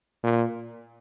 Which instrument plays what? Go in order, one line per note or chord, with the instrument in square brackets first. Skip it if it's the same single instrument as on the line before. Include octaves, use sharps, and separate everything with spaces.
[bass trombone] A#2